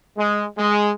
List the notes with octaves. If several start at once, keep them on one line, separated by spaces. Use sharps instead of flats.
G#3
G#3